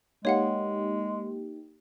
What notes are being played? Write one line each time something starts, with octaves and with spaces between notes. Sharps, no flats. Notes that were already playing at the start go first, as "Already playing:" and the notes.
G#3 A#3 D#4 G4 C#5 F5 F#5